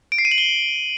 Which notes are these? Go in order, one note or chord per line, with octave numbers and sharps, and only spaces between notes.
D7
C7
D#7
F#7
G7